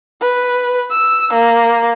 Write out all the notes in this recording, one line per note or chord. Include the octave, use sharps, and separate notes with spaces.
B4
E6
A#3